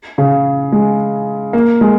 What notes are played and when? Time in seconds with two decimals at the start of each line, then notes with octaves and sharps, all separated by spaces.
0.18 C#3
0.72 G#3
1.53 A#3
1.81 G#3